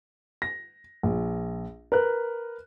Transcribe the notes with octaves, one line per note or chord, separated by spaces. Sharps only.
A#6
A#1
A#4 B4 F#6